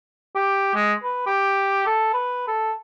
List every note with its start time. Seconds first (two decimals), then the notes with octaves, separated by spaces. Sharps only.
0.35 G4
0.75 G#3
1.03 B4
1.27 G4
1.86 A4
2.14 B4
2.48 A4